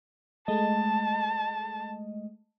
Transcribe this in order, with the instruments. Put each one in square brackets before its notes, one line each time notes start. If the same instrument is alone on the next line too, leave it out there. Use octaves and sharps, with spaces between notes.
[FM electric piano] G#3 A3 D#5 [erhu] A5